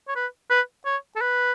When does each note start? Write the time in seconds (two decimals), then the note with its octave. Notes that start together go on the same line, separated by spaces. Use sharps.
0.08 C#5
0.16 B4
0.50 B4
0.86 C#5
1.16 A4
1.21 B4